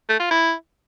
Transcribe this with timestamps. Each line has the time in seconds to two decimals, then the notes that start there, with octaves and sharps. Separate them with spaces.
0.09 A3
0.20 F4
0.31 E4